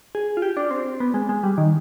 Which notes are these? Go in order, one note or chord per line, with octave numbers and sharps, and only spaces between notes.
G#4
F4
G4
D4
C4
B3
G#3
G#3
G3
D#3